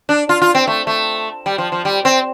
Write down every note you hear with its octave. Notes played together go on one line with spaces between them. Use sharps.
D4
F4
F4
C4
A3
A3
G3
F3
F3
G3
C4